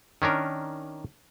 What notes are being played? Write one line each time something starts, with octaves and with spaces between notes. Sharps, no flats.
D#3 C#4 D4 A#4